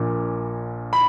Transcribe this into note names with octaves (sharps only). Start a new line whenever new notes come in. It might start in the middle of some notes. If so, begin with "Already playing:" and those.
Already playing: A#1 A#2
B5